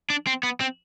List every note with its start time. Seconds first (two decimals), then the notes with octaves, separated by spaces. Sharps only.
0.10 D4
0.27 C4
0.43 B3
0.60 C4